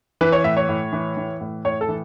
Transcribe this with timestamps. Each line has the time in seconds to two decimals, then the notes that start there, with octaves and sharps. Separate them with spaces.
0.21 E3 B4
0.32 C#5
0.44 A2 E5
0.57 C#5
0.69 A2
0.93 E3
1.17 E3
1.41 A2
1.65 A2 C#5
1.81 A4
1.89 E3